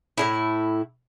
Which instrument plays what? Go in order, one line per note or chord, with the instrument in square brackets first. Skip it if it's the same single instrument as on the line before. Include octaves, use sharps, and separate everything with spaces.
[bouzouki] A2 C#3 E4